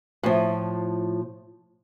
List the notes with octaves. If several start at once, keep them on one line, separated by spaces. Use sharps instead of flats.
A2 F3